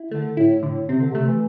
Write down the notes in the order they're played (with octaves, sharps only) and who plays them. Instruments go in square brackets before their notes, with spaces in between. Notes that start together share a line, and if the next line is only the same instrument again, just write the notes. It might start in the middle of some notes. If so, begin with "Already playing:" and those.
Already playing: [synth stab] E4
[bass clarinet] D3 [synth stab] A3
[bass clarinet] A2 [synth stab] E4
[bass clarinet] A2 [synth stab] D3
[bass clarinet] C3 [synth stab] C4
[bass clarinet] D3
[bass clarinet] C3 [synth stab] A3
[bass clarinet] E3